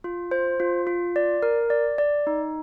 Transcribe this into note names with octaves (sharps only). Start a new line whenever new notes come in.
F4
C5
F4
F4
D5
A#4
D5
D5
D#4